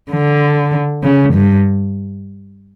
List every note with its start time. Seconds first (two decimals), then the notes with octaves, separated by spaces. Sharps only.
0.11 D3
1.03 C#3
1.34 G2